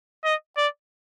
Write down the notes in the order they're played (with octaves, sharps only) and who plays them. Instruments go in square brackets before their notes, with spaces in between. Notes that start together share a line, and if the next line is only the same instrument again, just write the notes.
[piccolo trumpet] D#5
D5